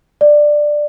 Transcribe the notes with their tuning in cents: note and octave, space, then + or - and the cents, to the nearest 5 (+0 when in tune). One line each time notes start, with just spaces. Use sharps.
D5 +10